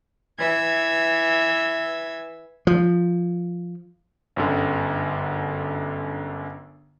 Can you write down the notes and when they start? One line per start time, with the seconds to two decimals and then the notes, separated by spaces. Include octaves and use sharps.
0.39 E3 E5 G#6
2.67 F3
4.36 G1 F#2 D3